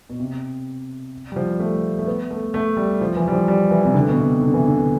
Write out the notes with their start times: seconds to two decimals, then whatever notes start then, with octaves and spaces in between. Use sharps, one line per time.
0.10 B2
0.20 C3
1.32 G3
1.36 F3
1.60 A3
1.99 A3
2.07 B3
2.30 A3
2.54 A3
2.77 G3
3.01 F3
3.16 E3
3.28 G3
3.32 F3
3.48 G3
3.71 E3
3.85 C3
3.94 D3
4.09 B2
4.18 C3
4.41 D3
4.54 E3
4.68 D3